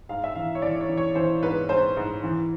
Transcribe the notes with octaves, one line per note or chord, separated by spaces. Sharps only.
G#2 F5
E5
E3 F5
C#5
E3 D5
C#5
E3
C#5
E3 C5
G#2 B4
G#2 C5
G#2
E3